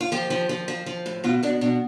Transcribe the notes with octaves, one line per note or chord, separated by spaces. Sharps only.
F4
F3 G4
F3
F3
F3
F3
A2
B2 F4
B2 D4
B2 D4